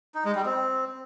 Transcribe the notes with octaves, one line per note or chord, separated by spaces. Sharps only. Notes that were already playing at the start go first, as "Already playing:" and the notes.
D#4
G#3
G3
C4